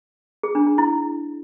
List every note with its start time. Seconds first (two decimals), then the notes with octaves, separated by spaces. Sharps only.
0.43 G#4
0.55 D4
0.67 D4
0.78 E4